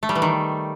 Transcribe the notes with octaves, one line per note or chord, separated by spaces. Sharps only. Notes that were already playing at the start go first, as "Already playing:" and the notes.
A3
G3
E3
D#3